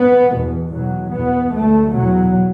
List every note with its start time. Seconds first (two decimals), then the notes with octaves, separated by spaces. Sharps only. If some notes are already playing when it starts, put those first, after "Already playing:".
Already playing: B3
0.32 E2 B2
0.73 E2 B2 F#3
1.12 E2 B2 B3
1.53 D2 A3
1.93 E2 B2 F#3